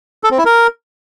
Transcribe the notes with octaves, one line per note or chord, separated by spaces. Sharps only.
A4
C4
E4
A#4